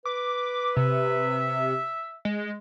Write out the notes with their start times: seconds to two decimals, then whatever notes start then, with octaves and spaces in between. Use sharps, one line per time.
0.05 B4 D6
0.76 C3 E5
2.25 G#3